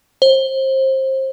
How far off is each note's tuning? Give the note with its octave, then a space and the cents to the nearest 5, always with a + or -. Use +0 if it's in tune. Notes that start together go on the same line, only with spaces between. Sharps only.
C5 +25